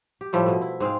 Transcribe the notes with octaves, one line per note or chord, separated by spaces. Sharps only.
G4
A2 F3 G3 A3
B2 A3
E4
G#2 C4 G#4 F5